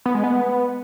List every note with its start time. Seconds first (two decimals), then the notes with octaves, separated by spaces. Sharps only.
0.06 B3
0.15 G#3
0.24 B3